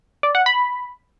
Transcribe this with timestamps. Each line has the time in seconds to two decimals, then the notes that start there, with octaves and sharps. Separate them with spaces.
0.23 D5
0.35 F#5
0.46 B5